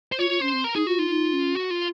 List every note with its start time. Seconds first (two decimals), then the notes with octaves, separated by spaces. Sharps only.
0.12 C5
0.19 F4 C#5
0.30 F4
0.41 C#4 C5
0.53 C4
0.64 A#4
0.75 D#4 G#4
0.87 F4 F#4
0.98 D#4 F4
1.09 D#4
1.33 C#4
1.55 F#4
1.71 F4